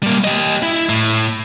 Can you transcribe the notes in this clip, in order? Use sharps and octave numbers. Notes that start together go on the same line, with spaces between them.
G3 A#3
G4 D#5
E4
A2